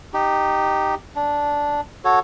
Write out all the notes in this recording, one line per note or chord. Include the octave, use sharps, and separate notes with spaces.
D#4 G4
D4
F#4 A4 C#5